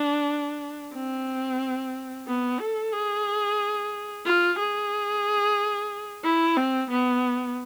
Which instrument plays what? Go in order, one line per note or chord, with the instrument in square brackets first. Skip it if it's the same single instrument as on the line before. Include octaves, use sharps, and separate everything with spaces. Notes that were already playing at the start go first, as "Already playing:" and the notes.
Already playing: [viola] D4
C4
B3
A4
G#4
F4
G#4
E4
C4
B3